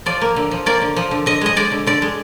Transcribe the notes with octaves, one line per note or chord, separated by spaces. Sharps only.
F3 D5
A#3
D3
F3
A#3 D5
D3
F3
D3
D3 D#5
G#3 D#5
G#3 D5
D3
D3 D5
G#3